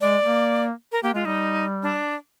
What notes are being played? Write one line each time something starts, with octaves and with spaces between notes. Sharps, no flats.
G#3 D5
A#3
A#4
A#3 G4
G#3 F4
G3 D#4
D4